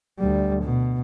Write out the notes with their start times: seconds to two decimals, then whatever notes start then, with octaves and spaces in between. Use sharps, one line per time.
0.19 D2 G3
0.64 B2